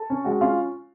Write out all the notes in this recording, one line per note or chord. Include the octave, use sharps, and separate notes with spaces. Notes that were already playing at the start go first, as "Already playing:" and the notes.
Already playing: A4 A5
C#4
G#3 F#4 F#5
C#4 F4 F5